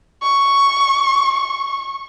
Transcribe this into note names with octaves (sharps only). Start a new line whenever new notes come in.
C#6
C#6